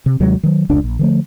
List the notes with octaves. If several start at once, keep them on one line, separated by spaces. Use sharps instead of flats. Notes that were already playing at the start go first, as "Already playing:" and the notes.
C3
D#2 C3 F#3 G#3
D#3 F#3
F1 C#2 D4
A#1
D3 F3 A3